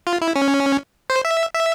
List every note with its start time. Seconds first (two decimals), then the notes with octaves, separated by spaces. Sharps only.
0.07 F4
0.21 E4
0.36 C#4
1.10 C5
1.25 E5
1.54 E5